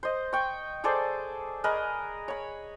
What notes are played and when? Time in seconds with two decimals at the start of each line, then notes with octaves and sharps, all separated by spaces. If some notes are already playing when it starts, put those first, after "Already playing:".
0.03 C5 D#5
0.33 G5 C#6
0.84 G#4 A4 C5 D5
1.64 G#4 A#4 B4 D#5
2.28 C#5 B5